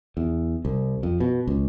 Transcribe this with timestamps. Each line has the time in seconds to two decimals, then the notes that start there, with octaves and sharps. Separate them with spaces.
0.17 E2
0.65 C2
1.03 F2
1.20 B2
1.47 C#2